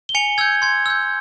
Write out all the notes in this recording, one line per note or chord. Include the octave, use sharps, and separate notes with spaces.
G7
G#5 C#7 F7
E6 G6 G#6
C6 G#6
E6 G6